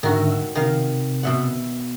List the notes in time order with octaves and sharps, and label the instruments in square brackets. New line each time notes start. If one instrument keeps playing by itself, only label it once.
[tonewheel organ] G#2 D3 E5 [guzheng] D#3 F#4
[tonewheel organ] C3 [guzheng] D#3 F5
[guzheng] B2 E5 F#5